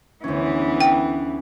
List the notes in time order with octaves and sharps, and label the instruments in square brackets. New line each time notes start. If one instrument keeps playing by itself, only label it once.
[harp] D2 C#4 [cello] E3 B3
[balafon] G5